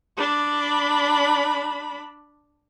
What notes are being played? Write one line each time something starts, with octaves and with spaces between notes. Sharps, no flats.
D4 B5